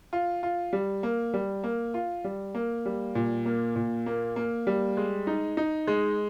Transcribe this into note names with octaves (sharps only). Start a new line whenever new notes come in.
F4
F4
G3
A#3
G3
A#3
F4
G3
A#3
G3
A#2
A#3
A#2
A#3
A#3
G3
G#3
D#4
D#4
G#3